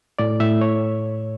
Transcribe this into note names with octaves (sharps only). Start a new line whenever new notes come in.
A2 D5
A2 E5
C#5